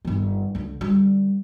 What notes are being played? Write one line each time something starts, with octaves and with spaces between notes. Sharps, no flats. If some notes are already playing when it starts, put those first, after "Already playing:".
G1 D#3
C#2 D3
D3 G3